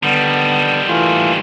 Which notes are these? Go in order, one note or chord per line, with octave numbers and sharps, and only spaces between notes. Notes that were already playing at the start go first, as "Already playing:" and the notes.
D3 D#3 G3 B3
E3 A3 F4